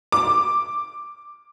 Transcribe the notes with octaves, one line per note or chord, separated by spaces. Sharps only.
D6